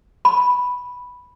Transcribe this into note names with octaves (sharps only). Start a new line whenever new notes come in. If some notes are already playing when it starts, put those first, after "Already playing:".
B5